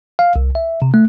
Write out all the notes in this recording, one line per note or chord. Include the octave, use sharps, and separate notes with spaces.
F5
C2
E5
C3
A3